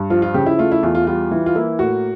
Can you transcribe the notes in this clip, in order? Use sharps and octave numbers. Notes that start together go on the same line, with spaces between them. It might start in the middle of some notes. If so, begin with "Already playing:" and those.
Already playing: G2
F3 F4
F4
C#3 G4
E4
A3 F4
E4
E2 F4
F4
G3 F4
E3
F4
A#3 E4
A2 F#4